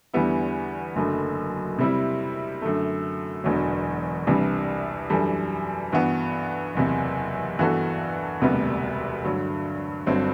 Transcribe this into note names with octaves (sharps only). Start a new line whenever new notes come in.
E2 D3 G3 B3 E4
F#1 F#2 D3 A3
C3 G3 C4 E4
F#2 D3 A3
E1 E2 D3 F#3
C2 C3 E3 G3 D4
F#2 E3 G3 D4 A4
G2 E3 B3 F#4
F#1 E2 C3
G2 E3 B3 F#4 A4
E1 D2 C3 G3 B3
G2 D3 F#3
G1 G2 F#3 C4